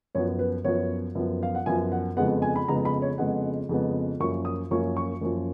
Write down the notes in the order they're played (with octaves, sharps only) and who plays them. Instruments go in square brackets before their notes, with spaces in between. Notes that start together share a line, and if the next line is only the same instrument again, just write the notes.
[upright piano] F#2 F3 B3 C#5
B4
F#2 F3 B3 C#5
F#2 F3 B3
F5
F#5
F#2 F3 B3 G#5
F#5
F2 C#3 G#3 B3 F#5
G#5
B5
F2 C#3 G#3 B3 A#5
B5
C#5
F2 C#3 G#3 B3 F#5
F2 C#3 G#3 B3
F#2 F3 A#3 C#4 C#6
D#6
F#2 F3 A#3 C#4 C#6
C#6
F#2 F3 A#3 C#4